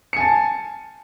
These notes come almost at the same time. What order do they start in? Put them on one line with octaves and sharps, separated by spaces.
C#7 G#5 A5